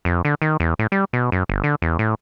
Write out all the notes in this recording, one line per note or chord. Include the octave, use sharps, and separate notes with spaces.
F2
D3
D#3
E2
A2
G3
B2
F#2
G1
D3
E2
A2